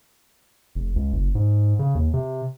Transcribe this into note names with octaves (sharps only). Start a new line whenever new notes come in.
F1
C#2
F#1
G#2
C#3
D#2
C3